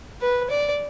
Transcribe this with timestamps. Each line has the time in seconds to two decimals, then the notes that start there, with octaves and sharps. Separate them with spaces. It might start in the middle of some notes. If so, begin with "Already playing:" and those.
0.22 B4
0.51 D5